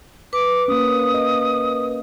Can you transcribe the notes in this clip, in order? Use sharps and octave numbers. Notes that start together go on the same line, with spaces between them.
B4 D6
A#3 C#4 D#6
D#5